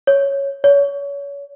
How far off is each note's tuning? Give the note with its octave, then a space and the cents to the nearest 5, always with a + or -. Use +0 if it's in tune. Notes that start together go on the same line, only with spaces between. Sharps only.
C#5 +0
C#5 +30